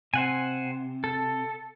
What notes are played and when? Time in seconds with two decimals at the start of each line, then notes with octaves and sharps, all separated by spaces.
0.14 C3 C5 F#5 G#5
1.04 A4